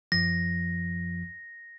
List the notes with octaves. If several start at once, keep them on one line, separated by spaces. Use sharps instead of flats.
F#2 F3 A#6